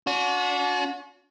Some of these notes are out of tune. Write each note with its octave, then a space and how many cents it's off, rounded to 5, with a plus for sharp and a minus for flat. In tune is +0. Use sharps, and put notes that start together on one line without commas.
D4 -45 F#4 -30